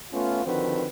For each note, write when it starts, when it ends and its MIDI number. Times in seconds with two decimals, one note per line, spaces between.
0.12 0.44 57
0.12 0.44 59
0.12 0.44 61
0.12 0.44 65
0.45 0.86 50
0.45 0.86 51
0.45 0.86 53
0.45 0.86 60
0.45 0.86 66
0.45 0.86 71